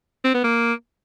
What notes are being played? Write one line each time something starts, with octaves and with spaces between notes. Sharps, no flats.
C4
B3
A#3